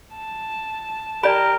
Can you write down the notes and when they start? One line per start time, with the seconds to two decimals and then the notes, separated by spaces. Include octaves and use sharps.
0.14 A5
1.23 G4 A#4 D5 B5